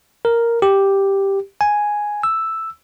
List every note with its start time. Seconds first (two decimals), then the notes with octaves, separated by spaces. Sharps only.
0.25 A#4
0.62 G4
1.61 G#5
2.23 E6